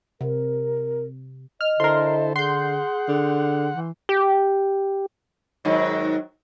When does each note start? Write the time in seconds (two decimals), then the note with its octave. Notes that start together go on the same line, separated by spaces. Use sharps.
0.21 C3 A#4
1.61 D#5 F6
1.80 D3 E4 A4 A#4 C5 C6
2.36 G#4 F#5 C6 G6
3.08 D3
3.77 E3
4.09 G4
5.65 G#2 D#3 F#3